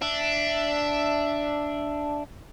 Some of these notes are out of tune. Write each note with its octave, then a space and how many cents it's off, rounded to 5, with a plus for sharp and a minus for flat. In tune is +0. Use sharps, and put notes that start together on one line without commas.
D4 +0 E5 +5